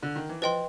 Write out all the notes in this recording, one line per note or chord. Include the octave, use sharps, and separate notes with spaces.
D3
D#3
E3
F3 B4 D#5 G5 C6